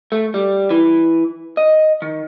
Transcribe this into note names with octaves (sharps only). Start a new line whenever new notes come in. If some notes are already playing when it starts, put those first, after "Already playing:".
A3
G3
E3
D#5
D#3